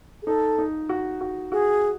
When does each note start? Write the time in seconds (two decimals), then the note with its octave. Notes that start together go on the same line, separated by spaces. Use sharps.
0.23 G#4
0.26 D#4 A4
0.58 D#4
0.89 F#4
1.21 F#4
1.52 F#4 G#4